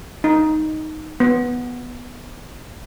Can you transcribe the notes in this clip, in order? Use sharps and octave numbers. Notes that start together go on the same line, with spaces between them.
D#4
B3